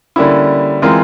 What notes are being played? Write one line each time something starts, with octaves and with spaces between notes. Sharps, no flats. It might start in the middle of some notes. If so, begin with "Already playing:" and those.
D3 G3 A#3 C#4 E4
E3 G#3 C4 F4 A#4